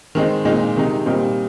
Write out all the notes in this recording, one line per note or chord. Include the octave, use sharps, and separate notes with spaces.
D#3 G#3 C4 D#4
A#2 G#3 C4 D#4
C3 D#3 G#3 D#4
A#2 G3 C4 D#4